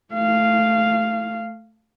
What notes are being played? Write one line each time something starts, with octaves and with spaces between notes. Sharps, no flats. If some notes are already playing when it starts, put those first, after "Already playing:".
A3 F5